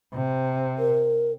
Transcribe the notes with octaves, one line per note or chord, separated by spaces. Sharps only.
C3
A#4